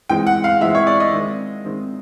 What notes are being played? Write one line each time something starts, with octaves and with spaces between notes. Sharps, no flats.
E3 G#3 C4 G5
F#5
F5
E3 G#3 C4 E5
C#5
D5
D#5
D#3 G#3 C4
D#3 G#3 C4